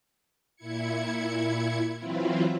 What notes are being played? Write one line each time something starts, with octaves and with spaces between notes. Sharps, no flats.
A#2 E4 G#6 C#7
E3 F#3 C4 E4 F4